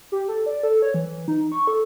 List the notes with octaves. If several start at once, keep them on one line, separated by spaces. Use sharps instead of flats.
G4
A4
D5
A4
C#5
E3
D#4
C#6
A4